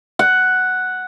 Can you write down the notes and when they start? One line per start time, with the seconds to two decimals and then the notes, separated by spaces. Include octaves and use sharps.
0.19 F#5